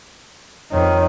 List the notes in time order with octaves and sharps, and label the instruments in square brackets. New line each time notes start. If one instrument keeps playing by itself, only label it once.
[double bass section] F2 [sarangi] D#3 [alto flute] C#5